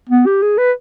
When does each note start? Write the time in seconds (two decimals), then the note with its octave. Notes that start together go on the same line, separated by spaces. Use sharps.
0.09 B3
0.26 G4
0.42 G#4
0.58 B4